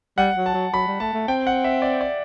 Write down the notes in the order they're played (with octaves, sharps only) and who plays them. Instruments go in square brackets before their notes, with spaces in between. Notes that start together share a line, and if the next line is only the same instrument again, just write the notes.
[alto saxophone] G3 [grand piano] F#5
[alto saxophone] F#3
[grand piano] A5
[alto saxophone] F#3
[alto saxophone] F#3 [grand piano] B5
[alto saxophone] G3
[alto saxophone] A3 [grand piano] A5
[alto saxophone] A3
[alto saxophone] C4 [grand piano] G5
[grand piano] F#5
E5
D5
D5